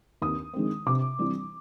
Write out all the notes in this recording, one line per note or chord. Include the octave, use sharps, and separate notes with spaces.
D#2 D#6
D#3 G#3 C4
C3 D6
E3 G3 C4